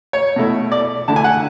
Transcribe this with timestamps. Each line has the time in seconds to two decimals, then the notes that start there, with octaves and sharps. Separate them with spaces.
0.13 C#5
0.36 B2 A3 E4
0.72 D5
1.08 D3 A3 E4 A5
1.16 G#5
1.24 F#5